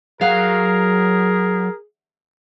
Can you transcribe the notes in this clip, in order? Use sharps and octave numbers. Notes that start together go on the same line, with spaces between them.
F#3 G#4 A#4 F5 F#5